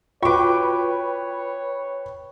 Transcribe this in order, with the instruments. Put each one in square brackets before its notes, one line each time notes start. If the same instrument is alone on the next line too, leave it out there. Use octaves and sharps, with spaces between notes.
[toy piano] F4 F#4 [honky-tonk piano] B4 G5 [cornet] C#5 [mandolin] C#6 D6